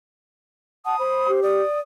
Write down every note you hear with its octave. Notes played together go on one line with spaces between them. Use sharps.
F#5 A5 D#6
C5 B5
G4
D5 D#6